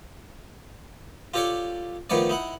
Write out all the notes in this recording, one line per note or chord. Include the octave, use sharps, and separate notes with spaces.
F4 G4 A4 C#5 D5
D#3 F3 A3 B3 C#5 D5
D#4 E4 F#5